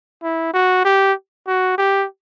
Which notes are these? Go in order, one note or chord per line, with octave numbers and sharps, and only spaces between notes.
E4
F#4
G4
F#4
G4